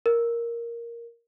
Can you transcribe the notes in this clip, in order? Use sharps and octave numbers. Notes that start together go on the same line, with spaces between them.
A#4